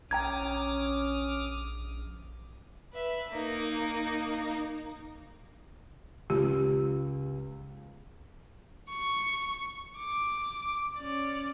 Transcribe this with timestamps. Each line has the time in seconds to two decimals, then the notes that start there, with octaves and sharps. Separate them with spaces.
0.11 A#1 C#4 G5 A#5 D6 D#6 F6 G#6
2.93 B4 E5
3.30 A#3 D#4
6.30 C#2 G4
8.90 C#6
9.98 D6
10.97 C#4 D5